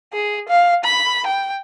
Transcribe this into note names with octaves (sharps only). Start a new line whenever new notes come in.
G#4
F5
B5
G5